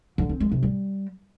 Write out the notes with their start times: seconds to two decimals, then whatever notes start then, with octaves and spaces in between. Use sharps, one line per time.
0.18 D3
0.29 C4
0.40 G#3
0.52 C3
0.63 G3